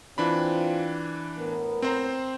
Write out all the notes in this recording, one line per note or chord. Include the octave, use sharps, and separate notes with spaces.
E3 C4 D4 F4 B5
A2 B3 A#4
C4 C5 A#5